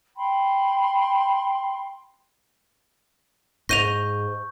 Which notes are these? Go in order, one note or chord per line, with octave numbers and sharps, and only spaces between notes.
G5 B5 C6
G#2 C#6 G6 A#6 D#7 F7